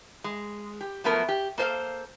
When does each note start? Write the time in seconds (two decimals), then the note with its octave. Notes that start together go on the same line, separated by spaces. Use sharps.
0.24 G#3
0.81 G4
1.04 F3 F#3 A3 B3 A#4
1.29 G4
1.58 A#3 A4 C5 D#5 F5